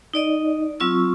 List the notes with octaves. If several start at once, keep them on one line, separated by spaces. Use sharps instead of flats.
D#4 D5 D#5
F#3 C4 F4 C#6 E6